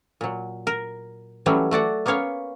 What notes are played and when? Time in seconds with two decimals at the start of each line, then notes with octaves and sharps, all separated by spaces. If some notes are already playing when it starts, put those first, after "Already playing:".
0.21 A#2 F#3
0.67 A#4
1.46 E3 F#3 G3 A3 C#4
1.71 A3 F#4 D5 F#5
2.06 A#3 B3 C#4 C#5 F5